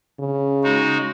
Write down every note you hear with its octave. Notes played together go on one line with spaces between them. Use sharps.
C#3
G#3 D#4 F#4